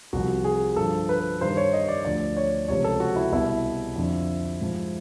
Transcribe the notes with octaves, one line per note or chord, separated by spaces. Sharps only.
C2 C3 F3 F#4
G#4
G2 D3 F3 A4
B4
G2 D#3 C5
C#5
D#5
D5
D2 D3 F3 D5
C#5
C#2 C3 F3 C#5
A4
F#4
E4
C2 B2 E4
F2 D3 F3
G#2 F3